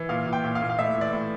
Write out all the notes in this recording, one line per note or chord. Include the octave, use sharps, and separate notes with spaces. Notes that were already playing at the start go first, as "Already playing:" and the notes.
Already playing: E3
A#2 F5
A#2
G5
A#2
F5
A#2
F5
A2 E5
E3
D5
A2